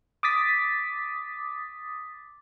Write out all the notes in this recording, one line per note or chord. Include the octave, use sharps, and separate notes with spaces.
D6 D#6 A6 B6